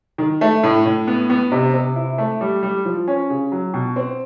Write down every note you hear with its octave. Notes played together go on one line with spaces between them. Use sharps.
D#3
A3
A2
A2
B3
B3
C3
C3
E4
A3
G3
G3
F3
C#4
C#3
F#3
B2
C4